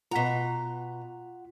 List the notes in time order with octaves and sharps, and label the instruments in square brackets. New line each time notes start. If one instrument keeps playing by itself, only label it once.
[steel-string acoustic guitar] B2 A#5 [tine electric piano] F4 F#5 B6